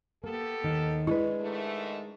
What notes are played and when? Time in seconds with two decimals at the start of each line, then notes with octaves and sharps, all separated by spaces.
0.24 A#3 B3 G4 A4
0.64 D#2 D#3
1.07 G#3 D4 E4 B4
1.41 G#2 D#3 A3